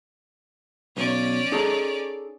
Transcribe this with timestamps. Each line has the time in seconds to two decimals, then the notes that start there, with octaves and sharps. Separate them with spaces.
0.97 B1 C#4 D5
1.52 D#4 G#4 A4